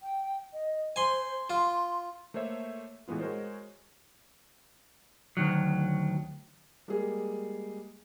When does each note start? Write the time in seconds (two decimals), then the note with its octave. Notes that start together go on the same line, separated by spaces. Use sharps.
0.02 G5
0.53 D#5
0.96 C5 G#5 C6
1.50 F4 C6
2.34 A3 A#3 C5 C#5 E5
3.08 A2 E3 G#3 B3 F4
3.20 G#3 F#4 A#4 C5 C#5
5.37 D2 D#3 F#3
6.88 G3 G#3 A#3 G#4